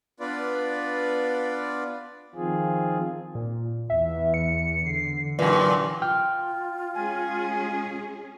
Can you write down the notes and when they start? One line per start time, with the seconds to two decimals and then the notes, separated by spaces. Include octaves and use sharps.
0.20 B3 D4 F4 B4 D5
2.35 D#3 F3 C4 F4 G#4
3.35 A#2
3.90 E2 E3 E5
4.34 C#7
4.86 D3 C7
5.39 F#2 A#2 E3
6.02 F4 G5 F6
6.94 G#3 C#4 G#4 G#5